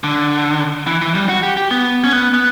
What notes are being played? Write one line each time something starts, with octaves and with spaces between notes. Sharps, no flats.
D3
E3
E3
G3
F#4
G4
G4
B3
C#4
B3
B3